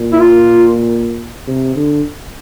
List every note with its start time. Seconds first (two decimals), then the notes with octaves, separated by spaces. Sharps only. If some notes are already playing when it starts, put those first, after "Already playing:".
Already playing: A#2
0.13 E4
0.20 F4
1.48 C3
1.76 D3